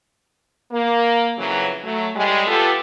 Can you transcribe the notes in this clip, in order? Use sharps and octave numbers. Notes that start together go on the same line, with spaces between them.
A#3
F2 C#3 E3 F#3
F#3 A3
A2 G3 G#3
B3 F4 G4 A4